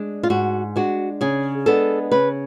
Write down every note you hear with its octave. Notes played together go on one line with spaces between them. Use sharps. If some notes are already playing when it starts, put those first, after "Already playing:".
Already playing: G#3 D4
F4
G#2 F#4
G#3 D4 F#4
C#3 G#4
G#3 B3 D4 A4
C#3 B4